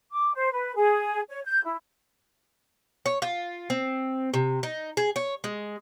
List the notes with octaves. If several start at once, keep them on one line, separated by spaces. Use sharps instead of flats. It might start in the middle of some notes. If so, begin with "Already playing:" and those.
D6
C5
B4
G#4
C#5
G6
E4
C#5
F4
C4
C3
D#4
G#4
C#5
G#3